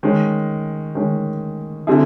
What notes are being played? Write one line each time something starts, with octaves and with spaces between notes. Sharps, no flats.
D#3 G#3 C#4
D#3 G#3 C#4
D3 G3 C4 E4 G#4